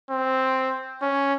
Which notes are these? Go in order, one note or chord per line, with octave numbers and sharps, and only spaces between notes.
C4
C#4